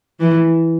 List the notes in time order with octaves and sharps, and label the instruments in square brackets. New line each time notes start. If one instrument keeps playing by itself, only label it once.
[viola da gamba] E3